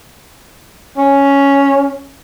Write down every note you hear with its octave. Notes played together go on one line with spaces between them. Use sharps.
C#4